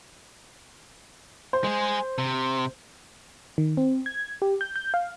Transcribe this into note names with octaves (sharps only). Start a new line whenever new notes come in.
C5
G#3 G#4
C3
D#3
C4
G#6
G4
G6
G6
F5